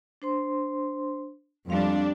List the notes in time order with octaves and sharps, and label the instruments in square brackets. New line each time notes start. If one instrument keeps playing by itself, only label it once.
[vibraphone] D4 C5 C6
[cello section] F2 G3 D4 [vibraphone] C4 F5